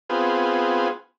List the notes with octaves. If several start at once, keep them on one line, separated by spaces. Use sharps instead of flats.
B3 C4 F4 G#4